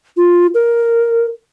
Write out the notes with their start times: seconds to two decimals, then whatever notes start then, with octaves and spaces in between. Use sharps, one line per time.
0.17 F4
0.55 A#4